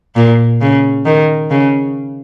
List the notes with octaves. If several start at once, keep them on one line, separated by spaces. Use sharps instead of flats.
A#2
C#3
D#3
C#3